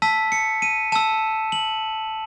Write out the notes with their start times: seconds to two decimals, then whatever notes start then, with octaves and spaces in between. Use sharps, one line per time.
0.02 A5 E6 B6
0.32 C#7
0.62 D#7
0.92 A5 E6 E7
1.52 F#7